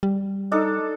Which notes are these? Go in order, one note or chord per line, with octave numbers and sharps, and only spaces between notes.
G3
D4 D#4 A4